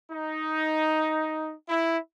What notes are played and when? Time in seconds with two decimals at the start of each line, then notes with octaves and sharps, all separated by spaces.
0.10 D#4
1.69 E4